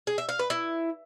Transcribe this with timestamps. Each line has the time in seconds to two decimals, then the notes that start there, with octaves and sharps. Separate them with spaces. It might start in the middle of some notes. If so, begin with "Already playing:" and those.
0.07 G#4
0.18 E5
0.29 F5
0.39 B4
0.50 E4